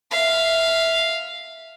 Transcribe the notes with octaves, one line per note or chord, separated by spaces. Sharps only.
E5 F5